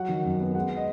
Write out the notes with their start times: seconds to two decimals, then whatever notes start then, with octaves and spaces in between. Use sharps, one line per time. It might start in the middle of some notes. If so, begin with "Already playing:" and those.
Already playing: F#3 F#5
0.09 D#3
0.25 F#2
0.41 B3
0.55 G#3 F#5
0.77 D#5